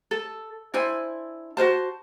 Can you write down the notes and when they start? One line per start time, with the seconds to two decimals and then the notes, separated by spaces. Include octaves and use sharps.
0.11 A4
0.74 D4 E4 C5 G#5
1.57 F#4 B4 C5 A5